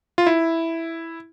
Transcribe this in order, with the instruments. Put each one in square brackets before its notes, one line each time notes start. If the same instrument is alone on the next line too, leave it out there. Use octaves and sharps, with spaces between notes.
[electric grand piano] F4
E4